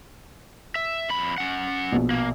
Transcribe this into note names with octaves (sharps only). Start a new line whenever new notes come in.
E5
F2 B5
C#4 F#5
A#1 B2
A#3